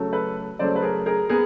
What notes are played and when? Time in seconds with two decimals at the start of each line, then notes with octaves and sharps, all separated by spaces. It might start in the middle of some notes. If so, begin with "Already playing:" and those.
Already playing: C#3 F#3 A3
0.13 A4 B4
0.59 C#3 F#3 A3 C5 D5
0.76 B4
0.82 G#4 A#4
1.06 G#4 A#4
1.29 B3 G#4 A#4